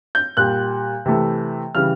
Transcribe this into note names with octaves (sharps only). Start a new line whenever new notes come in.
G6
A#2 G3 F#6
C3 E3 A3
C#3 E3 G3 F6